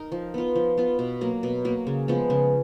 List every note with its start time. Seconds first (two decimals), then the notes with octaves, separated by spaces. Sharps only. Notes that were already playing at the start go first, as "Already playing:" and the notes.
Already playing: D#4 A#4
0.12 F3
0.34 B3 F4
0.55 F3
0.78 B3 F4
0.99 B2
1.21 F#3 A#3
1.43 B2
1.65 F#3 A#3
1.87 C#3
2.08 F3 G#3 B3
2.30 C#3